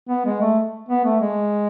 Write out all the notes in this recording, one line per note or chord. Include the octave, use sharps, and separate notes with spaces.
B3
G#3
A3
B3
A3
G#3